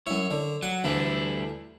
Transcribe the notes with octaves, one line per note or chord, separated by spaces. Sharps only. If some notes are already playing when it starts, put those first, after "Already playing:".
F#2 E4 C#5
D3
F#3 F#5
D2 E3 G3 D4 E4